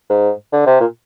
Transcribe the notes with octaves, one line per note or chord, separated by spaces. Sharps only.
G#2
D3
C3
A#2